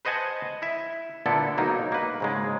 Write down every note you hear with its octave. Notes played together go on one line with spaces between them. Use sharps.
B4 C5 D#5 F#5 G#5 A5
E4 E5
A#2 D3 B3 E4 A4
B1 F#3 A#3 D#4
A#3 B4
G#2 C#3 G#3